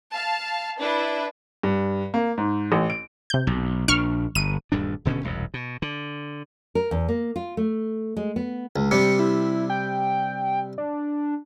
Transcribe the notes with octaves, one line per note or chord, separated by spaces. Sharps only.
F5 A5
D4 E4 B4
G2
A#3
G#2
A1
D7
C3 G6
B1
A#1 D4 C#6 F6
G1 D#7
D#1 D2 G2 D4
D#1 B2 D3 C#4
E1 C2 F#2
B2
D3
A#4
E2
A#3
F4
A3
G#3
B3
C#2
C3 G3 D4 C#7
E4
G5
D4